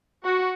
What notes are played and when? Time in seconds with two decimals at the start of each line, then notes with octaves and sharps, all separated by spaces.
0.24 F#4